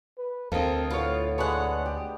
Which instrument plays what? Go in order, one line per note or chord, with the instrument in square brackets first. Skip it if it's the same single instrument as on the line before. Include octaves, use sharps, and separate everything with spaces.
[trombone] B4
[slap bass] D2 [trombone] C4 [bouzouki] A4 D#5 [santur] A#4 F5
[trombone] A2 [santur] B3 [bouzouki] F4 C#5
[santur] G#3 B3 D4 [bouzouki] C#5 F#5
[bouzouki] G4